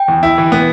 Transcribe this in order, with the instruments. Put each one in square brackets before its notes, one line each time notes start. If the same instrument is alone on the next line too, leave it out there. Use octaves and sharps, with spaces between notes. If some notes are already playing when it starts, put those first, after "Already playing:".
Already playing: [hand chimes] G5
[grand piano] E2
E4
E3
B3